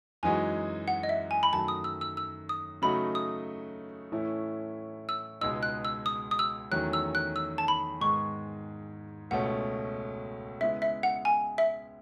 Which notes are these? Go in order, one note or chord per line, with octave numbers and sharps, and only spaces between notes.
F#2 E3 G#3 D#4 F#4 G#5
F#5
D#5
E5
G#5
B5
F#2 D#3 F#3 A3 A5
D#6
E6
E6
E6
D#6
C#3 F#3 A3 D#4 F#4 B5
D#6
A2 E3 A3 C#4 E4
E6
C#2 B2 G#3 D#4 E6
F#6
E6
D#6
D#6
E6
E2 D#3 F#3 A3 C#4 F#6
E6
F#6
E6
A5
B5
G#2 D#3 G#3 B3 C#6
C#2 B2 A3 C#4 F#5
C#3 G#3 B3 E4 E5
E5
F#5
G#5
E5